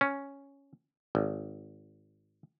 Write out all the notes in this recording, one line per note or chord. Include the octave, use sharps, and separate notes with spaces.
C#4
G#1